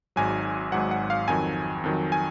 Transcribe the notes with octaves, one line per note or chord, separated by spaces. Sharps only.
G#1 G#2 F#3 G#5
G#1 G#2 F#3 F#5
F#5
F5
F2 D#3 F#3 G#5
F2 D#3 F#3
G#5